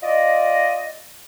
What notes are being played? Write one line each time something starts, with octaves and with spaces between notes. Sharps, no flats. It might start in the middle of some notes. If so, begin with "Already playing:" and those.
F4 D5 D#5